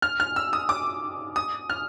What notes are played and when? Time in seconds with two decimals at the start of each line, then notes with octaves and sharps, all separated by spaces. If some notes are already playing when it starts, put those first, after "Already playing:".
0.02 F6
0.20 F6
0.36 E6
0.53 D#6
0.69 D6
1.36 D#6
1.70 F6